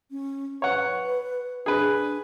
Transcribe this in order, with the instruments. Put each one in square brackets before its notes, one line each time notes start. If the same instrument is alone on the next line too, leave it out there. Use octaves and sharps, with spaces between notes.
[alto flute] C#4
[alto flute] B4 [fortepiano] C#5 F#5
[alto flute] D4 [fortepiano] G#4 B4